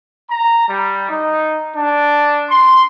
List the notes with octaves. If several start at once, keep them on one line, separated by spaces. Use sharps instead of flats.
A#5
G3
D#4
D4
C6